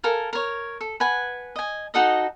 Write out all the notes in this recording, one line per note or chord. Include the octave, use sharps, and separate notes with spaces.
A4 A#4 F5 G#5
A#4 C#5
A4
B4 F#5 G#5
D#5 G#5
D#4 F#4 A4 D#5